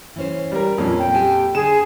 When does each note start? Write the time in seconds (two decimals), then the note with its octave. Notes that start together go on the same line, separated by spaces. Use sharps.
0.16 E3 C#4 C5
0.52 G3 A#4
0.78 F2 A#2 A#3 C#4
0.99 G5
1.14 G4 G#5 A5
1.55 D3 G#4 E7